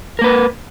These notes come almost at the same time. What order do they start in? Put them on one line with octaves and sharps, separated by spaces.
A#4 A#3 B4